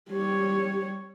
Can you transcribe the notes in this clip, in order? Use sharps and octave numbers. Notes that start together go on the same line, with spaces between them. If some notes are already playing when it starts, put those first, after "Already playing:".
G3 G4 C#5